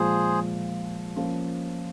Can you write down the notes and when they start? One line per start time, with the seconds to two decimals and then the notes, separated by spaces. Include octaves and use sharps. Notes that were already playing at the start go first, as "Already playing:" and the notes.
Already playing: A#2 F3 G#3 G#4 C5
1.16 F3 A#3 C#4 F4